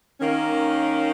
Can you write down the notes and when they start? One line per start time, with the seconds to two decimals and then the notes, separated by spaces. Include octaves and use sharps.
0.20 D#3 A#3 C#4